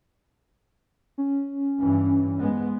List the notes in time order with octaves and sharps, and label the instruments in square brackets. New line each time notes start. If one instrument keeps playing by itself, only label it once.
[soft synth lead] C#4
[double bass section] G2 E3
G#2 G#3 B3